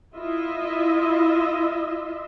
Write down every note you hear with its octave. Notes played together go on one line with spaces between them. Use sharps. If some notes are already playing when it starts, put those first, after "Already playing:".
E4 F4 D#5 E5